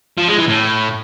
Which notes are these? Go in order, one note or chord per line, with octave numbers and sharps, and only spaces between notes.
F3
G#3
E3
A2